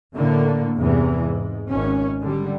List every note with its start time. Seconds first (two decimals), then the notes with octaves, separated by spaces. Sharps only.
0.14 A2 D3 A#3
0.75 E2 G2 C3 E3
1.22 G#2
1.70 G#1 C#4
2.21 D3 G3